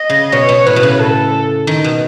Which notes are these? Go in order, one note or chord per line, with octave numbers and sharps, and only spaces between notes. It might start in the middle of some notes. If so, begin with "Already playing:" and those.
Already playing: D#5
C#3
B2 C#5
B2
A2 B4
B2
C#3
A4
D#3
B2